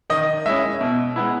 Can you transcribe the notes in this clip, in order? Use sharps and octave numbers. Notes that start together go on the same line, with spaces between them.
D#3 D#5
G#3 C#4 E4 E5
B2
G#3 B3 E4